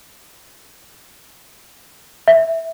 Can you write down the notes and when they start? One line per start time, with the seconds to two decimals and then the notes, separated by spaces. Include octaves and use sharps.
2.28 E5